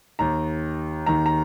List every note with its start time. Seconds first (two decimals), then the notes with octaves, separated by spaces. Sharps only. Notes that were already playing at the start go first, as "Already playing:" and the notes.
0.19 D#2 D#3 A#5
1.06 D#2 D#3 A#5
1.26 A#5